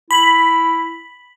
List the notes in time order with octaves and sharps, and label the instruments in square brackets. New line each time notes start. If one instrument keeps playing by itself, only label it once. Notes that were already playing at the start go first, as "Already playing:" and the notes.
[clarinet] E4 [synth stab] B5